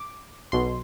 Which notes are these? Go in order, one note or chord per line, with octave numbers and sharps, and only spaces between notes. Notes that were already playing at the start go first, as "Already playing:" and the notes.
Already playing: D6
B1 B2 C6